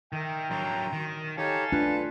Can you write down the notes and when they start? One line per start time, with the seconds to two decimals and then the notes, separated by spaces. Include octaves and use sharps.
0.13 D#3 A#4 E5 G5
0.51 F#3 D4 A#5 C6
0.93 D#3
1.38 D#4 G4 A4 C#5 F5 G#5
1.72 A3 D4 F4 B4